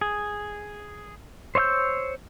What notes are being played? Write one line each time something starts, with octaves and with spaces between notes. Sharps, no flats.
G#4
C5 C#5 D#5 E6 G6